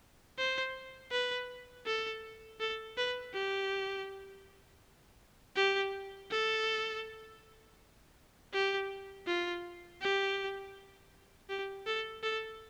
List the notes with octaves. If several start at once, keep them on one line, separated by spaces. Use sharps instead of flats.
C5
B4
A4
A4
B4
G4
G4
A4
G4
F4
G4
G4
A4
A4